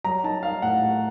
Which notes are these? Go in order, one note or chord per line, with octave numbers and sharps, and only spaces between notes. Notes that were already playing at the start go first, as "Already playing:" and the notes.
F#3 A#5
D#4 A5
D#4 F5
A2 F#5
A2